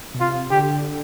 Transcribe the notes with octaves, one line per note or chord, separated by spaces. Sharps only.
B2
C3 F4
D3 G4